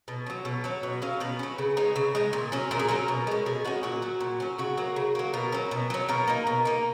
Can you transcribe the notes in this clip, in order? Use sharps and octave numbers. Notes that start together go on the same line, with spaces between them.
B2
F#3 C#4
B2
F#3 C#4
B2 F#4
F#3 C#4 F5
B2 B4
F#3 C#4
C#3
G#3 D#4
C#3
G#3 D#4
A#2
F#3 C#4
A#2 A#4
G#4
F#3 C#4 A#4
B2
G#3 C#4
B2 G#4
G#3 C#4 F#4
A#2 F#4
F#3 C#4
A#2
F#3 C#4
C#3 F#4
F#3 A#3
C#3
F#3 A#3
B2 A#4
F#3 C#4
B2
F#3 C#4
B2 A#4
A#3 D#4
B2
A#3 D#4